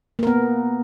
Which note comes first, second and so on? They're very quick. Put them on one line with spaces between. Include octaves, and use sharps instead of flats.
A#3 A#4 B3